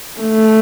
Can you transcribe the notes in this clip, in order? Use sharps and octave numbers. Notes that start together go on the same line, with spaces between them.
A3